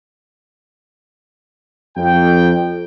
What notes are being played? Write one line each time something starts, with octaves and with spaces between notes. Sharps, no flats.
F2 G5